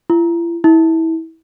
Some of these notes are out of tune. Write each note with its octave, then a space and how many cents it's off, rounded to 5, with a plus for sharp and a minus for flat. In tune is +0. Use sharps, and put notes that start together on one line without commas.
E4 +45
E4 -25